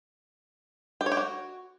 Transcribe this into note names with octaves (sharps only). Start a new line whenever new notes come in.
G4
C#5
G4
F#4